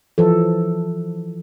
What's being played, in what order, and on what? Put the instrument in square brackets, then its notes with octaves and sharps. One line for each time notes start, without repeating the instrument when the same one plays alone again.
[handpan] E3 F3 A4